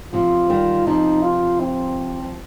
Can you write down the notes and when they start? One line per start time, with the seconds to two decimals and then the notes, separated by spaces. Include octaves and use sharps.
0.13 C3 F3 F4
0.50 D#3 G3
0.87 C3 F3 D#4
1.23 F4
1.60 C4
2.22 F3